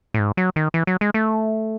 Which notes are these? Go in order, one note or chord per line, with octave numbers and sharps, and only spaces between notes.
A2
G#2
F#3
D#3
E3
F#3
G#3
A3